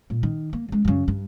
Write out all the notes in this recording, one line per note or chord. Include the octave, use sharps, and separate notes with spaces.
A#2
D#3
A#3
C#3 G#3
F#2 C#3
G2